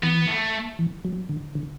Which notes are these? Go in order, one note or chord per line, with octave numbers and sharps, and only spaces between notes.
E3 B3
A3
E3
F#3
D3
D3